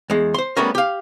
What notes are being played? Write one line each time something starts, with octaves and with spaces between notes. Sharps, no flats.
E2 G#3
C5 C6
G3 A3 B3 C#4 A#4
G4 F5